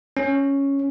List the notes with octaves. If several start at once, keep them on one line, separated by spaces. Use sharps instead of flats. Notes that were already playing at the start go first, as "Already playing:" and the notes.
C#4